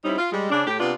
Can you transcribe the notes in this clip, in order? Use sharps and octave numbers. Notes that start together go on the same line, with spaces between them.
G3 C4 C#4 D#4 E4
F4
G3 G#3
C#3 D4
A2 G4
C3 B3 D4 F4